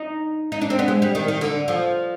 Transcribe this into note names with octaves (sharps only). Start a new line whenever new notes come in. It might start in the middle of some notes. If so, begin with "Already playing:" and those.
Already playing: D#4
D#4
D4
C4
B3
G#3
G3
D#3
D#3
D3
F3